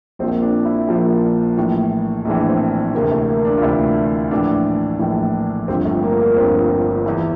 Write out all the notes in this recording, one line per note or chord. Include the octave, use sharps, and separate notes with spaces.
A#1 A#2 F3 C4
D4
E4
A#1 A#2 F3
A#1 A2 E3
A#1 A2 E3 D4
C4
D2 C3 E3 A#3
A3
A#3
D4
F4
D2 C3 E3 E4
A#1 A2 E3 D4
A#1 A2 E3
G1 G2 F3 C4
A3
A#3
A#3
G1 G2 F3 C4
E2 E3